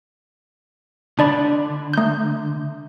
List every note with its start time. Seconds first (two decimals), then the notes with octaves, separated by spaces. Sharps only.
1.19 D3 D4 D5 B5
1.93 A3 G6